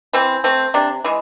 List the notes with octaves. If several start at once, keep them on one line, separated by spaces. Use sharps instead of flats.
E3 C4
A3 C4
C3 D4
E3 G#3